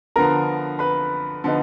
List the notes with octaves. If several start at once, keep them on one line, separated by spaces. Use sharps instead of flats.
D3 F3 B3 A#4 A#5
B4 B5
D3 F3 B3 D#4